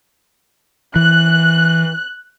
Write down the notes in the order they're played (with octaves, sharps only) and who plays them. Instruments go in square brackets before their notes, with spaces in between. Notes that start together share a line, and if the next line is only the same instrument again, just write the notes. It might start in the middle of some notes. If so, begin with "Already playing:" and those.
[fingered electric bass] E3 [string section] F#6